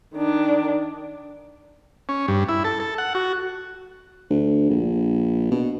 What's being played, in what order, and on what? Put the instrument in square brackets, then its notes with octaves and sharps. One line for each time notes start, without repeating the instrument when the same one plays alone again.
[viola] D#3 D4
[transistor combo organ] C#4
G2
E4
A4
A4
F#5
F#4
[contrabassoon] D2
A#1
B2